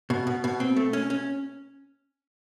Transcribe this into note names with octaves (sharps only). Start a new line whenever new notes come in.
B2
B2
B2
C4
A3
C#4
C#4